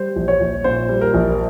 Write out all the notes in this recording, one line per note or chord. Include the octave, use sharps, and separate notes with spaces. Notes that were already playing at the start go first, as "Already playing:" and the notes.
Already playing: G3 C5
A#1
C#5
A#1
A#2 C5
G3
A#4
A#1